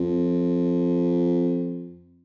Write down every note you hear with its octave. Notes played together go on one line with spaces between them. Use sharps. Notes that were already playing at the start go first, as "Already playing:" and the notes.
Already playing: F2